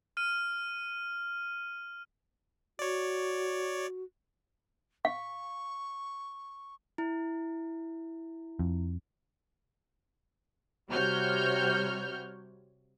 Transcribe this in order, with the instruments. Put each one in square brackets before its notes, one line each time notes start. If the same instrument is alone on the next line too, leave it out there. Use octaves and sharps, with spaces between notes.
[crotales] F6 D#7
[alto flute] F#4 [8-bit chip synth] C#5 D5
[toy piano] F5 [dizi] C#6
[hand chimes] E4
[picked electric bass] F2
[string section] C3 G3 F#4 C#5 F6 G6